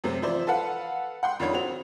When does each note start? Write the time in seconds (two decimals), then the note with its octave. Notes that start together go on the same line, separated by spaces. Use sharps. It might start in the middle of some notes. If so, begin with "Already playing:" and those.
0.04 F#2 C3 A3 C4
0.22 E3 F3 E4 C5 D5
0.47 A4 B4 F5 F#5
1.23 F#5 G5 C6
1.40 F2 D#3 D4 C#5 B5
1.54 C4 F#4 F7